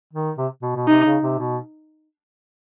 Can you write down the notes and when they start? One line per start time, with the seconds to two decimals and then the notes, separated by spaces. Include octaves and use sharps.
0.13 D#3
0.37 C3
0.62 B2
0.76 B2
0.88 C3 D#4
1.05 C#3
1.22 C3
1.39 B2